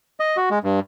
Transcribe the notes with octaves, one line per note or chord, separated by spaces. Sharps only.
D#5
F#4
G#3
G2